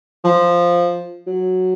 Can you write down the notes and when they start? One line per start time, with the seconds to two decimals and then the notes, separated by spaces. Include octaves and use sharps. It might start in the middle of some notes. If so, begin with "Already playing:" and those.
0.24 F3
1.27 F#3